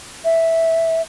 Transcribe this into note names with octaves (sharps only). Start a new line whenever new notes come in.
E5